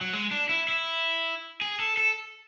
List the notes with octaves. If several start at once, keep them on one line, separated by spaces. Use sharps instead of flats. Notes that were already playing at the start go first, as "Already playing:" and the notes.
F#3
G#3
D4
E4
E4
G#4
A4
A4